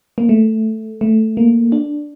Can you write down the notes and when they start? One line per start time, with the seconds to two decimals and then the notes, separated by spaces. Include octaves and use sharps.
0.18 A#3
0.29 A3
1.01 A3
1.37 A#3
1.72 D4